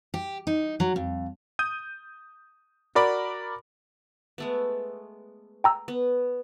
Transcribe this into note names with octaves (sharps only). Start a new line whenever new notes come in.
G4
D#4
F#3
F2
D#6 G6 D#7
F#4 A#4 D5 B5 D6
G#3 A3 B3
G5 A#5 E6
B3